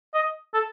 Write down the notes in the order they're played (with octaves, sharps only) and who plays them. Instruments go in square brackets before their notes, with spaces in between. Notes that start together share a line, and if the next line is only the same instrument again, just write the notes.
[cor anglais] D#5
A4